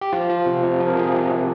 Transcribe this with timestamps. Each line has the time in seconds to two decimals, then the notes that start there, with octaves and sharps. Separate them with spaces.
0.01 G4
0.13 F3 F4
0.30 F3
0.46 C3
0.63 C3
0.80 F3
0.86 A#4
0.97 F3 G#4
1.14 C3 G4
1.31 C3